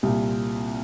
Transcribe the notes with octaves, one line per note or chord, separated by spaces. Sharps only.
C2 A#2